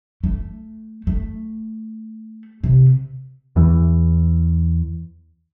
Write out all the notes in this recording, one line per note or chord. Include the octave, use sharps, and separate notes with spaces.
A3
A3
C3
E2 E3